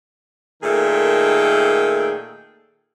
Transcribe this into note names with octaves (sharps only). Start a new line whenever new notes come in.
A#2 D#3 A3 G#4 A4 G5